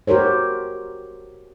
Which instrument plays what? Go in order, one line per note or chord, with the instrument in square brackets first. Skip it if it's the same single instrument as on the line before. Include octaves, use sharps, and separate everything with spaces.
[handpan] F#4 G4 A#4 C5 C#5